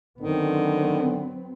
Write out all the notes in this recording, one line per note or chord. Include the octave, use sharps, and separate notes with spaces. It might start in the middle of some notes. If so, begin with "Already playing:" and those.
D3 D#3 F#3 B3 C4